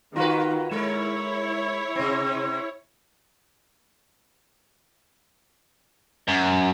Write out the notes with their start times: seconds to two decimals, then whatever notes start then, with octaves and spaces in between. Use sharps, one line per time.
0.16 D#3 F4 F#4 B4
0.71 G#3 E4 A#4 C#5
1.96 C3 C4
6.28 F#2